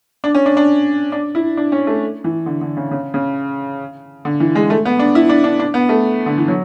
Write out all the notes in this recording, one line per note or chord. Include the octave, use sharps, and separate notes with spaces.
D4
C#4
D4
D4
D4
E4
D4
C#4
A3
E3
D3
D3
C#3
C#3
C#3
D3
E3
G#3
A3
B3
D4
E4
D4
D4
D4
B3
A3
D3
E3
F#3